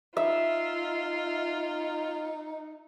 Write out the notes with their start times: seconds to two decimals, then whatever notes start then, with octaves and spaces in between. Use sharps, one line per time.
0.17 D#4 F4 E5